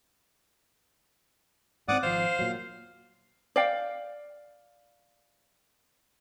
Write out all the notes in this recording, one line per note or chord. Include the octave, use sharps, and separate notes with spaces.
G#2 B3 C4 D5 F#5 D#6
G#1 F3 C5 F5
A#2 F#3
D5 F5 G5